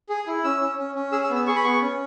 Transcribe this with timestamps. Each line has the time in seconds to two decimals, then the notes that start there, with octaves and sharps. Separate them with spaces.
0.09 G#4
0.27 E4
0.44 C#4 E6
0.61 C#4
0.78 C#4
0.95 C#4
1.12 G#4 E6
1.24 E6
1.30 B3
1.36 E6
1.47 G#4 C#6
1.56 B5
1.64 B3 C#6
1.81 C#4